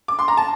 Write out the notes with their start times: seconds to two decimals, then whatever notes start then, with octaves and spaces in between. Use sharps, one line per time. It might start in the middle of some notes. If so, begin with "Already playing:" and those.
0.08 D6
0.19 C6
0.28 A#5
0.37 A5